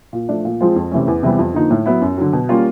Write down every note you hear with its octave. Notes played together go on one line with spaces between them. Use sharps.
A#2
F3 A3 D4
A#2
F3 G#3 C4 F4
F2
C3 E3 A3 C#4
E2
C3 E3 G3 B3
F2
D3 F3 A#3 D#4
A2
F#3 B3 E4
F#2
D3 F#3
B2
G3 A#3 C#4 F4